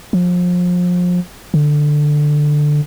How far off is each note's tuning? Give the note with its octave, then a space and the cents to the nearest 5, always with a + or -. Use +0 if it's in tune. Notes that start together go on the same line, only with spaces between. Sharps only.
F3 +30
D3 +10